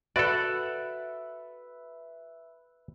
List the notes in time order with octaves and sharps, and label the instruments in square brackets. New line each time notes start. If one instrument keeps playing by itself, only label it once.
[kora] F#4 [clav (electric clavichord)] A4 D5 [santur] B4 E5